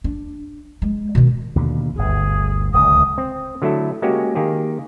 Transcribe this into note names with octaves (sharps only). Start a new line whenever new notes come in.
D4
G#3
B2 D#3
D#2 B2 D3
G1 D2 G#4
D1 C#2 D#6
C4
D3 F#3 A3 E4 A4
G#3 A#3 C#4 F#4 G4
D#3 A#3 G4 G#4